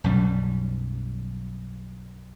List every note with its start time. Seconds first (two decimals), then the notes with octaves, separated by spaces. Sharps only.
0.04 B1 F#2 G3